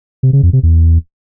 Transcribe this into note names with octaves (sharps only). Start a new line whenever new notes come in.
C3
C#3
F2
C3
E2